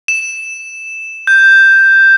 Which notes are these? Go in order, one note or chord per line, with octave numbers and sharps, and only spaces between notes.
E7
G6